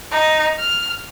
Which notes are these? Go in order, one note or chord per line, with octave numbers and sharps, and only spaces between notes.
D#4
F6